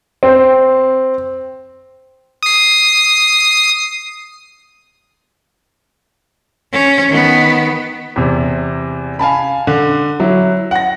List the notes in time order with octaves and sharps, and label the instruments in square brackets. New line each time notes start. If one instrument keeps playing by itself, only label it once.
[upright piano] C4
[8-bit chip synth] D#6 C7
[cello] C#4
D#3 B3
[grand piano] E2 C3
F5 G#5 A5 B5
D3
F#3 E4
F#5 A#6